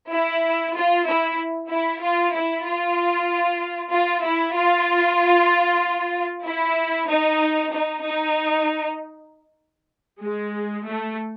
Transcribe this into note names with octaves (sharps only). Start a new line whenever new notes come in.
E4
F4
E4
E4
F4
E4
F4
F4
E4
F4
E4
D#4
D#4
D#4
G#3
A3